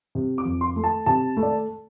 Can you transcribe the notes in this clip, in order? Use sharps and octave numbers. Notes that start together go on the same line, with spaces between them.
C3
D6
F2
C6
A3
A5
C3 A5
A3
D5